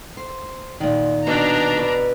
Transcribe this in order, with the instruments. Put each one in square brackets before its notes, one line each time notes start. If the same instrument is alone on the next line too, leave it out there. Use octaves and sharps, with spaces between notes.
[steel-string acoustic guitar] C5
A#2 D#3
[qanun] B2 G5 [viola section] D4 A#5
[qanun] B4 D5